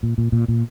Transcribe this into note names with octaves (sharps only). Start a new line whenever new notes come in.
A#2
A#2
A#2
A#2